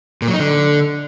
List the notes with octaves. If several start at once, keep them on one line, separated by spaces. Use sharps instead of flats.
A#2
F#3
D#4
D3